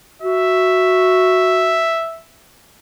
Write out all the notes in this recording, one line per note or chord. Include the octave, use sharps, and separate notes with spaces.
F#4 E5